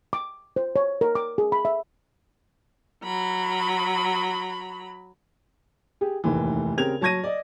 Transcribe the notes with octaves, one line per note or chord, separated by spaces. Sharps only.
D6
C5
C#5
A#4
D6
G#4
B5
E5
F#3 B5
G4 G#4
F1 D#2 A2 E3
C#3 C4 G4 A#4 G#6 F7
F#3 A5 C#6 G#6 A#6 D#7
D5 D#5